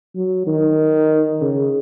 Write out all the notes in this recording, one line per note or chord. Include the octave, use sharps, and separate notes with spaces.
F#3
D#3
C#3